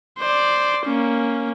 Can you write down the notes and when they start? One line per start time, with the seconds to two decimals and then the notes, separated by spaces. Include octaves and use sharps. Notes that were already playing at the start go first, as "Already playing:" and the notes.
0.19 C5 D5
0.86 A#3 C#4